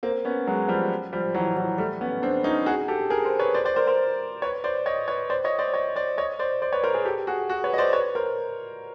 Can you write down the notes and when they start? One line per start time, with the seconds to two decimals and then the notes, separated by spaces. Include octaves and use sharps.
0.03 A#3 C4
0.25 B3 C#4
0.47 F#3 G#3
0.68 F3 G3
1.13 F3 G3
1.34 E3 F#3
1.57 E3 F#3
1.78 G3 A3
2.01 B3 C#4
2.22 C4 D4
2.44 C#4 D#4
2.66 F#4 G#4
2.88 G4 A4
3.10 G#4 A#4
3.25 A#4 C5
3.39 B4 C#5
3.54 C5 D5
3.65 C5 D5
3.76 A#4 C5
3.87 A#4 C5
4.42 B4 C#5
4.64 C5 D5
4.86 C#5 D#5
5.08 B4 C#5
5.30 C5 D5
5.45 C#5 D#5
5.59 C5 D5
5.74 C#5 D#5
5.96 C5 D5
6.18 C#5 D#5
6.39 C5 D5
6.62 C5 D5
6.72 B4 C#5
6.84 A#4 C5
6.94 G#4 A#4
7.05 G4 A4
7.27 F#4 G#4
7.49 F#4 G#4
7.64 B4 C#5
7.74 D#5
7.78 C5 D5
7.93 B4 C#5
8.15 A#4 C5